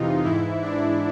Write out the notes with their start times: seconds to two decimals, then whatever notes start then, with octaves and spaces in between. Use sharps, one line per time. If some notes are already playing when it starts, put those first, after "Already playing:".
Already playing: F2 C3 E3 D#4 F4
0.24 G#2 E3 E4
0.62 D4